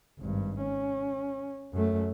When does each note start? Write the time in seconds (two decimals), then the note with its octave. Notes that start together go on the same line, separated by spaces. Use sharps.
0.19 G#1 G2
0.60 C#4
1.73 F#2 A3